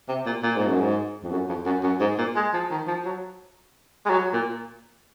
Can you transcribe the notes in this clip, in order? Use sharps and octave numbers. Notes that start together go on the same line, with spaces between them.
C3
A#2
A#2
G#2
F#2
G#2
F2
F#2
F2
F#2
F#2
G#2
A#2
G#3
F3
D#3
F3
F#3
G#3
F#3
A#2